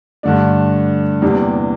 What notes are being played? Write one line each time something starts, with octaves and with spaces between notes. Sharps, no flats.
G2 D3 A3 D4
E2 C3 G3 A#3 D4